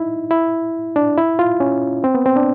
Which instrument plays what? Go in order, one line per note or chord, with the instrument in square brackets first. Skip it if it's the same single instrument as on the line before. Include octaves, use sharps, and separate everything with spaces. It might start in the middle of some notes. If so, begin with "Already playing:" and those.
Already playing: [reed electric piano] D#4 E4
E4
D4
E4
F4
C#4
C4
B3
C4
D4